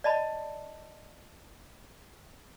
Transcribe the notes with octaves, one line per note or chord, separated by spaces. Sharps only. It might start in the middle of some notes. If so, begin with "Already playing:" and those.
D5 D#5 A5 B5